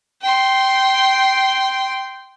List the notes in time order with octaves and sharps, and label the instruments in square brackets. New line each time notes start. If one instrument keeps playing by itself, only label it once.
[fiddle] G5 C6